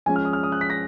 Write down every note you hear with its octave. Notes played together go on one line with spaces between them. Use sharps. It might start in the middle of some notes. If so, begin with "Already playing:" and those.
F3 G#3 C#4 G#5
F6
D#6
F6
D#6
F#6
B6
A#6